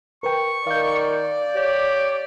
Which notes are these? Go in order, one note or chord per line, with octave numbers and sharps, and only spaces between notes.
A#4 B4 G5 C#6
D#3 D5 F5 G6
G4 C#5